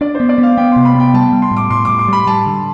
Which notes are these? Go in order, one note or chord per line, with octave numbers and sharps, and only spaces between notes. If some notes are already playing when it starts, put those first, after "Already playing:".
D4 D5
C5
B3
D5
B3
F5
B3 G5
C3 C6
B5
B3 G5
G3 A5
G3
C6
A2
D6
A2 C6
A2 D6
C6
G3 B5
G3 A5
D3